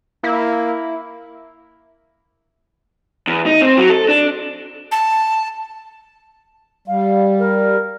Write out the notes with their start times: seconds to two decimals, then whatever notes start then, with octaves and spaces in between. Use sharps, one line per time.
0.23 A#3 E4
3.27 E2
3.46 D#4
3.61 C4
3.77 F#3
3.90 A4
4.08 D4
4.91 A5
6.88 G3 F5
7.39 A#4